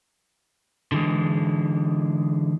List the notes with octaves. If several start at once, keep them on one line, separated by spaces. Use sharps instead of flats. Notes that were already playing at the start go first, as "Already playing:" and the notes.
D3 E3 G#3